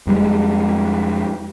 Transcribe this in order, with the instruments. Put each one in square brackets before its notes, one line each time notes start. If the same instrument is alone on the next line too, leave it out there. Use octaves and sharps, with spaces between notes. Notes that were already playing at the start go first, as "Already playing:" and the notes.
[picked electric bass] F2 G3 G#3